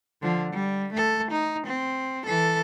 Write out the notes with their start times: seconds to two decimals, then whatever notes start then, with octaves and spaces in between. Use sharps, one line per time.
0.22 D3 F3
0.53 G3
0.93 A3 A4
1.32 D#4
1.67 C4
2.25 E3 A4